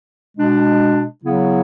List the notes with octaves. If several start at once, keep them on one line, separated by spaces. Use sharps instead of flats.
B2 G#3 D4
C#3 F#3 B3 E4